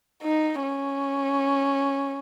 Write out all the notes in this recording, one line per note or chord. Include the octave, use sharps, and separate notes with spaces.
D#4
C#4